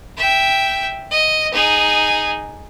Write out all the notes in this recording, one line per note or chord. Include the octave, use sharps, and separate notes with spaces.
E5 G5
D#5
D#4 G#4